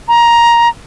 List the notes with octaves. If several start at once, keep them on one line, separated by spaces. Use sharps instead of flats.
A#5